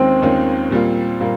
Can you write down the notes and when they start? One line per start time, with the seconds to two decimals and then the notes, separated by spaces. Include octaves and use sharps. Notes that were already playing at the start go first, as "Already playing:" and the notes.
Already playing: D#2 D#3 G#3 C4 C#4 F4
0.22 D#2 D#3 G#3 C#4 F4
0.71 A#2 G3 A#3 F4
1.20 A#2 G3 A#3 F4